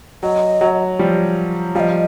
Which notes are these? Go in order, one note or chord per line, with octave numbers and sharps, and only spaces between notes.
F#3 D#5
F#3
F3 G3
F3 G3 D#5 F5